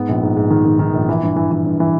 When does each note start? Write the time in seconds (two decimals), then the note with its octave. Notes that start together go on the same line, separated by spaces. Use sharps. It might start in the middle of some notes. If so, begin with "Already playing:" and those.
Already playing: G#2 B3
0.09 A#1
0.23 G#2
0.37 G#2
0.51 D#3
0.65 D#3
0.79 D#3
0.94 A#1
1.09 E3
1.23 G2
1.36 E3
1.51 E3
1.66 G2
1.80 E3